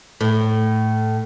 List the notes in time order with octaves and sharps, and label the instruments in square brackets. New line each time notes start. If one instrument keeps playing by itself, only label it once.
[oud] A2